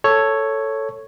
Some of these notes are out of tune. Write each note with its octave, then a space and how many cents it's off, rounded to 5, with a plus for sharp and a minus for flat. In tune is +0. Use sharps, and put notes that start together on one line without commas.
A4 +5 C#5 +0